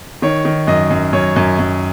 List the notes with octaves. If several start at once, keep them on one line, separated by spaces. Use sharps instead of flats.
D#3 C#5
D#3
F#2 D#5
F#2
F#2 C#5
F#2
F#2